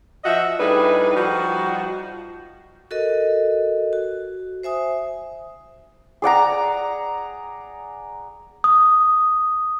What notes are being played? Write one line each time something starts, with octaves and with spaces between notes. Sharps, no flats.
F3 F#4 D#5 E5
A2 G3 D4 D#4 G#4 B4
F3 G3 D#4 F#4
F#4 A4 A#4 D#5
F#4
C5 E5 G#5 D#6
G#4 D5 F#5 A#5
D#6